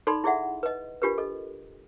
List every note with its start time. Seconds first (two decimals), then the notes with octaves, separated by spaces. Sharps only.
0.07 D#4 A4 D5 B5 C6
0.24 E4 G#4 D5 E5 F#5
0.63 B4 D#5
1.02 D4 F4 G4 A#4 B4
1.18 A4 D#5